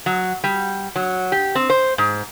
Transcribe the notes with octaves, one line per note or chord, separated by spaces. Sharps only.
F#3
G3
F#3
G4
C4
C5
G#2